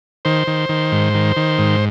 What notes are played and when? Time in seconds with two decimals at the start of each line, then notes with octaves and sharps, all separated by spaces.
0.25 D#3 C5
0.47 D#3
0.69 D#3
0.92 G#2
1.15 D#3
1.36 D#3
1.58 G#2